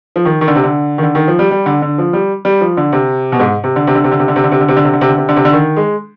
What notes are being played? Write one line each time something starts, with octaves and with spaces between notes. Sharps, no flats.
F3
D#3
D#3
D3
C3
D3
D#3
D3
D#3
F3
G3
G3
D3
D3
F3
G3
G3
F3
D3
C3
B2
G#2
C3
D3
C3
D3
C3
D3
C3
D3
C3
D3
C3
D3
C3
D3
C3
D3
C3
D3
C3
D3
C3
D3
D#3
G#3